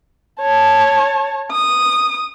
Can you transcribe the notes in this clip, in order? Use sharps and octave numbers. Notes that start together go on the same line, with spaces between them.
C#5 A5
D#6